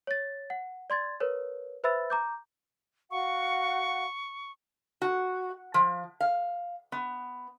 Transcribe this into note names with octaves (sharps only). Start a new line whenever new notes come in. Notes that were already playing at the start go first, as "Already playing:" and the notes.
C#5 A6
F#5
D5 C6 G#6 A6
A#4 B4 C#5
B4 C5 E5 B5 E6 A6
A#5 D6 G6
F#4 F5 F#5 C#6
F#4
F3
F5
B3